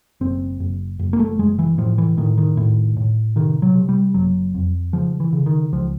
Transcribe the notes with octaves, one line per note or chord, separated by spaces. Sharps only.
F#1 C4
F#1
F#1
A#3
A3
F#1 G#3
E3
A2 F3
E3
A2 D#3
D#3
A2
A2
C3 D#3
F#3
C3
G3
F#1 F#3
F2
C#3 F3
E3
C#3
D#3
C#2 F3